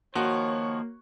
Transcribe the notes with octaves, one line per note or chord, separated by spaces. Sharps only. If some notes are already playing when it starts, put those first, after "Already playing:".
D#3 F3 A#3 F#4 C#5